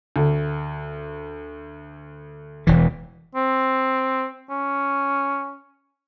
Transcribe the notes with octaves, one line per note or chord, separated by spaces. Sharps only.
D2
E1 E3
C4
C#4